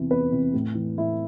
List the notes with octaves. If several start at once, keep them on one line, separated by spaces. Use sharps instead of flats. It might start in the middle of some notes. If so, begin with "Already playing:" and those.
Already playing: E2 C3 E3
E2 B4
C3 E3
A2
E3
A2 E4